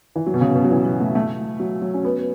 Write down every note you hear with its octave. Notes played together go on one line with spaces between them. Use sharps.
E3
F#3
B2
C#3
B2
F#3
E3
F#3
A3
A3
F#3
F#3
C#4
B3